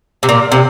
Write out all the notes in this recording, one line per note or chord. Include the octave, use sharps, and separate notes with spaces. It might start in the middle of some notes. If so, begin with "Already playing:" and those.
C3
A#2
C3